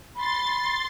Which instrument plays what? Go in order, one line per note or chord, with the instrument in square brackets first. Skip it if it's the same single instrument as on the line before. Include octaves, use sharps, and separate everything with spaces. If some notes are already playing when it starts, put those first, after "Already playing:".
[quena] B5 [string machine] C6 A6